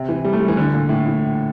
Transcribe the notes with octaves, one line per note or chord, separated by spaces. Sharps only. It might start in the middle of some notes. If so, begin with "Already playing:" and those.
Already playing: C3
E3
G3
A3
G3
E3
D3
A#2
A2
A2